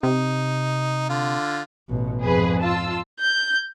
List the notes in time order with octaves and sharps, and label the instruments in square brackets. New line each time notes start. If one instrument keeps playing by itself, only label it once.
[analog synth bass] C3 [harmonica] D#4
[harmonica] D3 F4
[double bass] A1 B2
[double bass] F2 G#2 [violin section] G#4 B4
[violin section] F4 A5 E6
[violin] G6